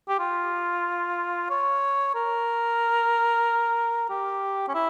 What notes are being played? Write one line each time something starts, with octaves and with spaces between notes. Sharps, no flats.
G4
F4
C#5
A#4
G4
C#4
E4